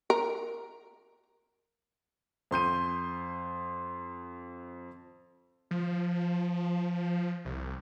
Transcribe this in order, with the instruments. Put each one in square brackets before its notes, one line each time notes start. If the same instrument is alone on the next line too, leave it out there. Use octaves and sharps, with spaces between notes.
[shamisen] A#4
[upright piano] F2 C6 G6 D#7
[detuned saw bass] F3
C2